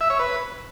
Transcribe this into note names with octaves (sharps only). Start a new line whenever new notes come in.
E5
C#5
B4